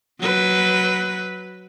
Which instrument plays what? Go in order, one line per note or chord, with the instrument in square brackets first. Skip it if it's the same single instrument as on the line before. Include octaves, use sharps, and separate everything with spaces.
[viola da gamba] F#3 B4